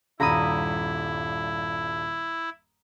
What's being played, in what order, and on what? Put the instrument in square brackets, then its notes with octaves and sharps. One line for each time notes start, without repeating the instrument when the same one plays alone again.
[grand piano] D#1 G2 [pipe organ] E4 [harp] A#5 B5 D#6